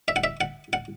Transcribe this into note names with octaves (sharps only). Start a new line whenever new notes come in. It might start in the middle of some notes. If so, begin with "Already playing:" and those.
E5
F#5
E5
F#5
F#5